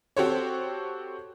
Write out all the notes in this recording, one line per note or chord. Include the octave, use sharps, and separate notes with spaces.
C4 F#4 G4 A4 C5 C#5